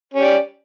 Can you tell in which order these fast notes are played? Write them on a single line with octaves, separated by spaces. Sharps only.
C#4 G4 D5